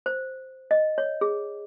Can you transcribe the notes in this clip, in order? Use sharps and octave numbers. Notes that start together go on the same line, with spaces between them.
C5
D#5
C#5
G#4